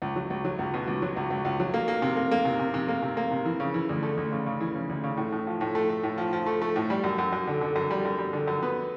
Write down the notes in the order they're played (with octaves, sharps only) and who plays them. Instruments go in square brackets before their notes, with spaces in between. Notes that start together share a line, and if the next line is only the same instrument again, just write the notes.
[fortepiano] C#2
F#3
C#2
F#3
C#2
B2
C#2
F#3
C#2
C#2
C#2
F#3
A#3
A#3
C3
A#3
A#3
C3
C3
C3
A#3
C3
A#3
C3
E3
C#3
E3
D2
A3
D2
C#3
C#3
E3
C#3
D2
C#3
A2
A2
F3
A2
A3
A3
A2
F3
F3
A3
A3
A2
G3
F#2
F#2
F#2
D3
D3
F#2
G3
F#2
G3
D3
F#2
B3